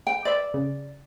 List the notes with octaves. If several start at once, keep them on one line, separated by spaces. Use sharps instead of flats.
G5
B4 C5 D5 E5
C#3